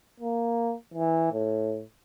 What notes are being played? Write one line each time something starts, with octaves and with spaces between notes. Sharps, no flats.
A#3
E3
A2